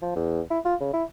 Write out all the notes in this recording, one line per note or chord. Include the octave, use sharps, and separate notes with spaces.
F3
E2
E4
F4
C#3
E4